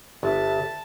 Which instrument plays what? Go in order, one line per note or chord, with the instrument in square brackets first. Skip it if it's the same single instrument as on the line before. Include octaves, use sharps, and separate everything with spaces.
[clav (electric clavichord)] G1 [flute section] E5 [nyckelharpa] A5